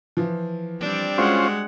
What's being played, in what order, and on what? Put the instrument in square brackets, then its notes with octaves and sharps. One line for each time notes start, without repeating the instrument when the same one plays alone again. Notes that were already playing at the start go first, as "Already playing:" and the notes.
[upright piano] E3 F3
[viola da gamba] G3 C4 D4
[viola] G#3 F#5 [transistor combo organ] C#4 F4 C5 [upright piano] F#4